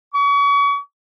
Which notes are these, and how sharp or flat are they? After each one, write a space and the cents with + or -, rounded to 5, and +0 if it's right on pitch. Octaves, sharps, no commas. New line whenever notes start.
C#6 +35